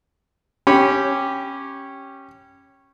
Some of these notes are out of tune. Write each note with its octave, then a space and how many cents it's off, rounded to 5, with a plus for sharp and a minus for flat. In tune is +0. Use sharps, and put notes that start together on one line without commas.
C#4 -15 G4 -5 B5 +0